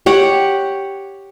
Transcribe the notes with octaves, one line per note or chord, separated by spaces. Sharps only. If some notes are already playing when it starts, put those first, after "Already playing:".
G4 C#5 F#5